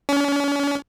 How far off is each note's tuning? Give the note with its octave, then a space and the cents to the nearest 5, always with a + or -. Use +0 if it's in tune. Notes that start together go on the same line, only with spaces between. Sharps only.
C#4 +40